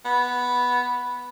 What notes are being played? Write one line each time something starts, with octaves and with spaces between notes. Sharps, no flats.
B3